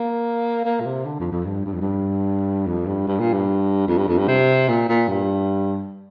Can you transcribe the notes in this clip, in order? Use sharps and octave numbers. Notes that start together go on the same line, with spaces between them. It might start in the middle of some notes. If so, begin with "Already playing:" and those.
Already playing: A#3
A#3
A#2
C3
D3
F2
F2
G2
G2
F2
G2
F2
G2
G2
A#2
G2
F2
G2
F2
G2
C3
A#2
A#2
G2